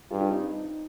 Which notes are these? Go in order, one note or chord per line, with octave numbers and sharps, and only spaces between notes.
G2 F4 G#4
D4 F4
C4 D#4